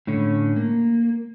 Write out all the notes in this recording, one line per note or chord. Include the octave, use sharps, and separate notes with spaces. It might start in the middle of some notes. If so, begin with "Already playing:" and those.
A2 D3 C#4
A#3